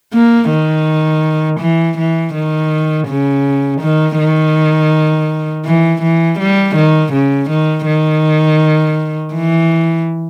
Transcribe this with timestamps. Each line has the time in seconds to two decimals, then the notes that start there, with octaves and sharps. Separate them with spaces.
0.13 A#3
0.50 D#3
1.60 E3
1.98 E3
2.34 D#3
3.08 C#3
3.81 D#3
4.18 D#3
5.65 E3
6.02 E3
6.39 G3
6.76 D#3
7.13 C#3
7.49 D#3
7.85 D#3
9.34 E3